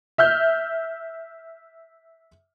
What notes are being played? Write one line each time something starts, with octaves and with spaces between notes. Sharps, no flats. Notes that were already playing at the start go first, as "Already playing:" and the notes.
E5 F6 G6